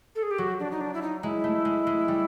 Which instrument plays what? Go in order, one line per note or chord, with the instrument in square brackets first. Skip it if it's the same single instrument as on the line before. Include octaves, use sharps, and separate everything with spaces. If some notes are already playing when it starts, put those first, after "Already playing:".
[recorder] A4
G#4
G4
[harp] F#3 [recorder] F#4
[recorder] D4
D#4
D4
E4
D#4
[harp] G#3 [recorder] E4
[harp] A3
G#3
G#3
G3